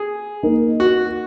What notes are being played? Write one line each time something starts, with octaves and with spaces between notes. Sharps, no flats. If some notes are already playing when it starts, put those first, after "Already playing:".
Already playing: G#4
A#3 D#4 A#4
F#4